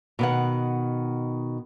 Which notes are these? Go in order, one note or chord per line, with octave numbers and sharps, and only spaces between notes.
B2 D#3 F#5